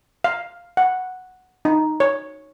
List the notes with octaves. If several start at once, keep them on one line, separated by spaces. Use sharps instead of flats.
F5
F#5
D#4
C#5